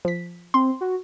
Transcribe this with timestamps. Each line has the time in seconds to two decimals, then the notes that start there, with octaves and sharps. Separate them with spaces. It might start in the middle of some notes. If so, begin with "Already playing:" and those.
0.05 F3 B6
0.54 C4 C6
0.81 F#4